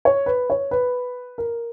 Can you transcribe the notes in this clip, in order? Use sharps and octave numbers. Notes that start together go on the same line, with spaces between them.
C#5
B4
C#5
B4
A#4